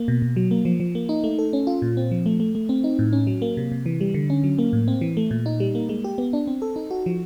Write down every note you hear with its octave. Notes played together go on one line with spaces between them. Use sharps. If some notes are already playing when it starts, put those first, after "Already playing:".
Already playing: A#3
B2
B2
F#3
A#3
F3
F3
A#3
D#4
A3
A4
C#4
F4
A#2
C4
F3
A3
A3
A3
C4
D#4
A2
C#4
F#3
A#3
C3
C3
E3
G3
D3
C#4
F#3
A#3
A2
C4
E3
A3
A#2
D#4
G3
A#3
G#3
G4
B3
D4
C4
A4
D#4
F#4
F3